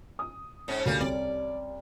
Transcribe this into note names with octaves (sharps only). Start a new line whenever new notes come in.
D#6
G#2 C#4
D2 G3 A#3 C#4
C2 D5